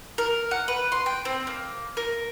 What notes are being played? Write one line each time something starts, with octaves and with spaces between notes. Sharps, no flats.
A#4
F#5
B4
C6
G5
C4
A#3
A#4